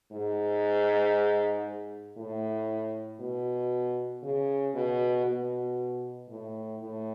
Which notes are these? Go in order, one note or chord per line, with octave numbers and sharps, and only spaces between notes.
G#2
A2
B2
C#3
B2
B2
A2
A2